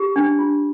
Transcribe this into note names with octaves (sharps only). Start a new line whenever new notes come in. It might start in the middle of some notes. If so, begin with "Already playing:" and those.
Already playing: G4
D4
F4